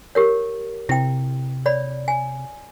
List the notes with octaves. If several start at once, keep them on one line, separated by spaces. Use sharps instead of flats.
G4 A#4 C#5
C3 E4 G5
C#5 D5 B5
G#5